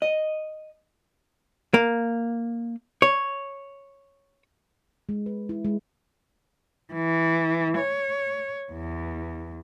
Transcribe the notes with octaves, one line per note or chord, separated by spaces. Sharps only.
D#5
A#3
C#5
G#3
B4
E4
G#3
E3
C#5
E2